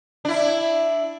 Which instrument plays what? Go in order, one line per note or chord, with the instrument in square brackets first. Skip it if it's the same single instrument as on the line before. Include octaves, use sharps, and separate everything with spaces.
[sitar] D4 E4